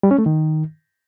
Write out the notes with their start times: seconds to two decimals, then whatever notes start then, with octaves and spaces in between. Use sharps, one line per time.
0.03 G3
0.11 C#4
0.18 A3
0.26 D#3